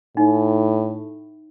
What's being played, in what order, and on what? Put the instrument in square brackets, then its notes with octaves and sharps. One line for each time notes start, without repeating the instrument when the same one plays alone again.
[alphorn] A2 [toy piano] D#4